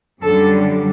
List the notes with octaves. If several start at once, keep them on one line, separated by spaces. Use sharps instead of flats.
F#2 D3 G3 A4